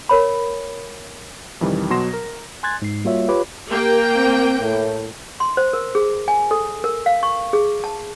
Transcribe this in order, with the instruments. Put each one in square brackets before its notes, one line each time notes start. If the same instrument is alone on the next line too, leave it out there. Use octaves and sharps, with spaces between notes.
[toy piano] A#4 C#5 B5
[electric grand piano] F2 C3 D#3 E3 G3
B2 F#3 C6 A#6 E7
A#4
[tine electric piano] G#5 C6 F#6 G#6 A6
G#2 C7
G3 A#3 F4 F#4 C#5 E5
F4 G4 B4 C#5 B5 D6
[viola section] A#3 G5 [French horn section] G4 A#4
[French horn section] C4
A2
[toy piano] C6
C5
A#4
G#4
G#5
A4
A#4
F5
C#6
G#4
A5